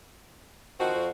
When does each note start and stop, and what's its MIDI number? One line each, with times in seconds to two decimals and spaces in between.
0.80 0.90 51
0.80 1.08 53
0.80 1.08 60
0.80 1.08 66
0.95 1.10 41